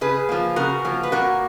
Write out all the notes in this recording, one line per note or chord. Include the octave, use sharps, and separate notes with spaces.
C#3 G#4 B4
F3 A#3
C#3 F#4 A#4
F3 A#3
B4
A#2 F#4 A#4